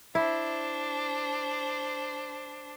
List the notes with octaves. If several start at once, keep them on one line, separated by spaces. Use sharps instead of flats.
D4 E4 C5